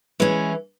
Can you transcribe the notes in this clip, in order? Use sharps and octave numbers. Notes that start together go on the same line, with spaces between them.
E3 G#3 C#4